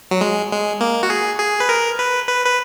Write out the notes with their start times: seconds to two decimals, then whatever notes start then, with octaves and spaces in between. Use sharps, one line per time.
0.11 F#3
0.21 G#3
0.51 G#3
0.81 A#3
1.03 F#4
1.10 G#4
1.39 G#4
1.60 B4
1.69 A#4
1.99 B4
2.28 B4
2.46 B4